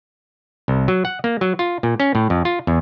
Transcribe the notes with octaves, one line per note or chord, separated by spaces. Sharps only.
C2
F#3
F#5
A#3
F#3
F4
A#2
C#4
A2
F2
F4
E2